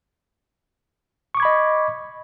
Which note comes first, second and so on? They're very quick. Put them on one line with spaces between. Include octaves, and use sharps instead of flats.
C#6 D6 G#6 B5 D#5